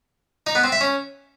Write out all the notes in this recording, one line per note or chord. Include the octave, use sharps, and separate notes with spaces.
D#4
B3
C4
E5
C#4